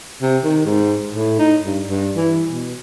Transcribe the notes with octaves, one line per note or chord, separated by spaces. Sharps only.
C3
D#3
G#2
A2
D#4
G2
G2
E3
B2